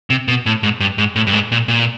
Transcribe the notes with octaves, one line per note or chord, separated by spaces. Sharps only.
C3
B2
A2
G#2
G2
G#2
A2
G2
G#2
A#2
A#2